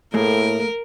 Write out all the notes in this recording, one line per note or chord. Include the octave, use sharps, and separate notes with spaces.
A2 A3 A#3 G#4 A#4